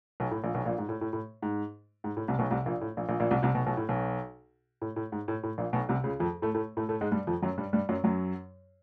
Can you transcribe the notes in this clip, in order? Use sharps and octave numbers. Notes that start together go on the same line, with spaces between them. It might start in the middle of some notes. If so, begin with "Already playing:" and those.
B1 B2
A2
A#1 A#2
B1 B2
A#1 A#2
G#2
A2
A2
A2
G#2
G#2
A2
C2 C3
B1 B2
C2 C3
A#1 A#2
A2
A#1 A#2
A#1 A#2
A#1 A#2
C2 C3
C2 C3
B1 B2
B1 B2
A2
B1 B2
A2
A2
G#2
A2
A2
A#1 A#2
B1 B2
C2 C3
C#2 C#3
F2 F3
A2 A3
A2 A3
A2 A3
A2 A3
G#2 G#3
G2 G3
F2 F3
F#2 F#3
G2 G3
G2 G3
F#2 F#3
F#2 F#3